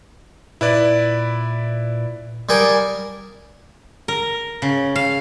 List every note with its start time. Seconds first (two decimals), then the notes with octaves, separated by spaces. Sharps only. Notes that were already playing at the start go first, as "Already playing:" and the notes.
0.61 A#2 E4 B4 D5
2.49 G3 G#4 A#4
4.08 A#4
4.62 C#3
4.96 F5